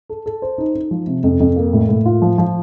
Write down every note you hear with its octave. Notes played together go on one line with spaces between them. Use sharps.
A4
A4
C5
D#4
D#4
F3
C3
F2
F2
A#3
A2
A2
F4
F3
F3